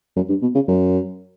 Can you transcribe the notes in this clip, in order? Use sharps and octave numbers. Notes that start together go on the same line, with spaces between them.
F#2
G2
B2
C#3
F#2